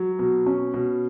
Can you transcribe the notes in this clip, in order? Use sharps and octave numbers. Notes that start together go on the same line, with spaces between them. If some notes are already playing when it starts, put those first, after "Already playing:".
Already playing: F#3
B2
C#4
B2